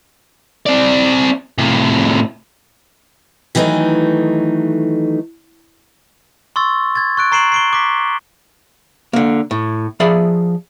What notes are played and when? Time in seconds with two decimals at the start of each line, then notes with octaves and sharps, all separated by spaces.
0.66 C4 D5
1.58 A2 C3
3.55 D#3 E3 F#3 A3 D#4 A4
6.56 C6 C#6 E6 A6
6.96 G#6 A6
7.17 C#6 F#6 D7
7.32 A#5 C#6 C7 D7 E7 F#7
7.52 C7 D7 G7
7.73 D6 B6
9.13 D3 A#3
9.51 A2
10.00 F3 G#4 D5 E5 B5